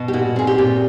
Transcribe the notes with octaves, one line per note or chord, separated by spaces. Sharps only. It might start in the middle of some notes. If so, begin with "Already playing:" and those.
Already playing: B2
G4
A#2 F#4
C4 G#4
G4
A#2